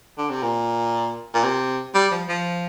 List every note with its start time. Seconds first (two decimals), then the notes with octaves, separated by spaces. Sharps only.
0.18 D3
0.30 C3
0.42 A#2
1.34 A#2
1.44 C3
1.94 G3
2.11 F3
2.28 F3